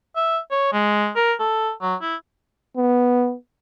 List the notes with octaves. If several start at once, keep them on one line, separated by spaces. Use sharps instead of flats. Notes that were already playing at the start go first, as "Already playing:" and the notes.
E5
C#5
G#3
A#4
A4
F#3
E4
B3